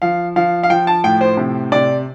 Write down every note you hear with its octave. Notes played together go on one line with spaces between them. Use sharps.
F3 F5
F3 F5
F5
F3 G5
A5
A2 G5
C5
C3
C3 D5